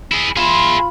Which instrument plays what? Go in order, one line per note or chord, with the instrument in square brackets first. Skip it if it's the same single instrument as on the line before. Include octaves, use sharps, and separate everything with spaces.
[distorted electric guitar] E4 G#4
[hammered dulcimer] F4 [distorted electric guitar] G#4 E5 [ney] B5